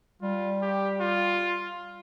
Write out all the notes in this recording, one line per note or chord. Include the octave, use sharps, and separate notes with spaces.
G3 F4
G4
F4